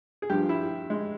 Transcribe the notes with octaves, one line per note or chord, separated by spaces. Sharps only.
G#4
G2 F3 G4
E4
G#3